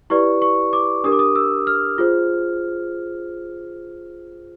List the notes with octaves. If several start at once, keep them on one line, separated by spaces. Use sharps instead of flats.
E4 G4 B4 D5 C#6
C#6
D6
D4 G4 A#4 D#6
D6
D#6
E6
F6
F4 G#4 C5